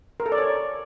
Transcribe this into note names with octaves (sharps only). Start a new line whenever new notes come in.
A#4
A4
D5
C#5